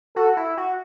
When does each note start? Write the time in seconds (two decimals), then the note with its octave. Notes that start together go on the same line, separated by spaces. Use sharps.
0.16 F#4 A4
0.37 E4
0.57 F#4